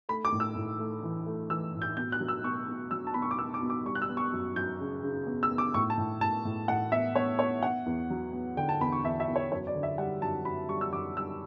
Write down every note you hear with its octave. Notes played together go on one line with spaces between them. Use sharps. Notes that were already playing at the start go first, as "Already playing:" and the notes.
A3 B5
D6
A2
E6
A2
A3
E3
A3
E3 E6
A2
G6
B2 G6
F#6
F#3
E6
B2 C#6
B2
F#3 E6
A5
B2 B5
C#6
D6
B3 E6
D6
B2
D6
G3 C#6
F#6
E6
B3
C#6
F#2
F#2 G6
C#3
C#3
B3
E6
B3
D6
A2 C#6
A5
A2
A2 A5
A2
A2 F#5
B3 E5
B3 C#5
B3 C#5
B3 F#5
E2
F#3
B3
D3 G5
A5
E2 B5
C#6
E2 E5
E5
E2
C#5
F#2 C#5
D5
D3
E5
G3 F#5
F#2 A5
F#2 B5
G3 C#6
E6
F#2 D6
G3 E6